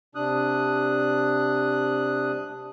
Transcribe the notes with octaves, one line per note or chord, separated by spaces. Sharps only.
C3 D4 D#6 F#6